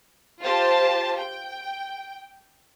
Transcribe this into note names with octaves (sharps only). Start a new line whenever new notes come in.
F4 G4 C5 A5
G5